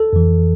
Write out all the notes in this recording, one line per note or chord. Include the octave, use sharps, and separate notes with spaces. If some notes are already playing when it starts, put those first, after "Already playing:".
Already playing: A4
F2 E3